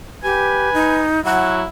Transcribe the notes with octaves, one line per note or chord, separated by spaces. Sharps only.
G4 B4 G#5
D#4
F#3 E4 F#5